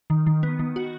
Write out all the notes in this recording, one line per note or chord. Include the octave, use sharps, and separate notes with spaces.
D#3
D#3
B3
D#3
F#4